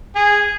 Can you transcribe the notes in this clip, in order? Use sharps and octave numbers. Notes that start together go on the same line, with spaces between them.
G#4